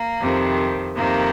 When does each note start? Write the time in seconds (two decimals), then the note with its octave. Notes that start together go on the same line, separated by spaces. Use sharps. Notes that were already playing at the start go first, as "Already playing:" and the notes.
Already playing: A#3
0.21 F2 C3 D#3
0.96 F2 C3 D#3 A#3